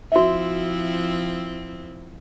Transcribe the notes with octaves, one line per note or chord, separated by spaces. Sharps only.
F3 C4 E4 F#4 E5